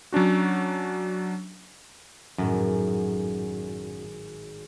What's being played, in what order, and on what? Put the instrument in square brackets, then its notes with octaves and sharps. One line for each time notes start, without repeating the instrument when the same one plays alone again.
[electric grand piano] F#3 C#4 D4 F#4
[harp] G#1 A2 F#3 [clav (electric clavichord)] F#2